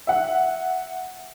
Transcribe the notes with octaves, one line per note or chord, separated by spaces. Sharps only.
E5 F#5